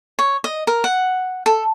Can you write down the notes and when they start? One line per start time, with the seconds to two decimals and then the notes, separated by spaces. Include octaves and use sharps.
0.19 C#5
0.44 D#5
0.67 A#4
0.84 F#5
1.46 A4